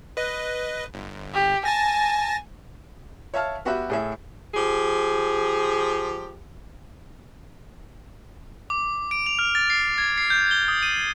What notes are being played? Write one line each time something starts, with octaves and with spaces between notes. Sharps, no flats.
B4 D#5
G1
G4
G#5 A5 A6 A#6
C#5 E5 F5 A5 F6
B3 F#4 G4 B4 E5
A2 G#4 E5
F3 G4 G#4
D6
D7
F7
F6
A6
C7
G#6
C7
G6
G7
D#6
D#7